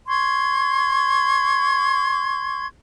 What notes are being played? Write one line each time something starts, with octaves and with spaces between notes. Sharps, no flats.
C6 C#6 G#6